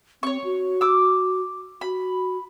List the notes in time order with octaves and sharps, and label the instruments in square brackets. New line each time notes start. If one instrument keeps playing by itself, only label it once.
[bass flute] C4 [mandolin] C#5 C#6
[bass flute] F#4
[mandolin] D6 E6
[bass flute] F#4 [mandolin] B5